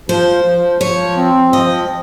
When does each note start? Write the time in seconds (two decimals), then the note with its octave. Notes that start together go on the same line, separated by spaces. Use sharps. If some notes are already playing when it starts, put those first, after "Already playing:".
0.09 F3 C5
0.44 F3
0.81 F3 C#5
1.17 C4
1.52 F3 D#5